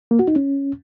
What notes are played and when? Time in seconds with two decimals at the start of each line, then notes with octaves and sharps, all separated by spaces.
0.11 A#3
0.19 F#4
0.28 D#4
0.36 C#4